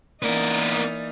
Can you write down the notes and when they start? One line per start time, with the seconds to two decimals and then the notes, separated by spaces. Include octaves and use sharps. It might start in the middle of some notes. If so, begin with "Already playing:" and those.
0.22 E3 A#3 B3 D#4 A#4 D5